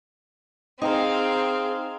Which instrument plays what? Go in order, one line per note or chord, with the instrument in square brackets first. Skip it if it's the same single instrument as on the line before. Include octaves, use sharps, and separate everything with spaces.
[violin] C4 [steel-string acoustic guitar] D#4 C5 [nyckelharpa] G#4 F5 [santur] D#5 G5 A#5